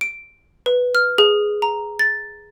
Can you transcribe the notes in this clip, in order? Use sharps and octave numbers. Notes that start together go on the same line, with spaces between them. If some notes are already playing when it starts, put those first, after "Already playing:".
D7
B4
F6
G#4
A#5
A6